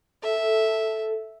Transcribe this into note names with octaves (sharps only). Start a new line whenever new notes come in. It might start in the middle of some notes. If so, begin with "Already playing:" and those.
A4 E5